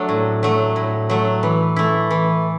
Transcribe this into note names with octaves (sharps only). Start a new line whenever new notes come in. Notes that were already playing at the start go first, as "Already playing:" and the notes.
Already playing: F#3 A3 D4 A4
A2
F#3 A3
A2
F#3 A3
E3
A3 E4
E3